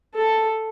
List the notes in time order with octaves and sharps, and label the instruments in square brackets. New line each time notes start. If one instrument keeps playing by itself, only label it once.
[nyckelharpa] A4